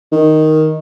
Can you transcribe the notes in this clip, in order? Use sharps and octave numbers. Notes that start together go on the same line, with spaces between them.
D#3